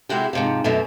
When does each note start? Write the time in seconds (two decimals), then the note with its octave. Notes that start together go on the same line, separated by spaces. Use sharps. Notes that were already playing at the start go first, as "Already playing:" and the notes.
0.09 C3 G#3 E4 F#4 G4
0.33 G#2 C3 F3
0.64 F#2 B2 A3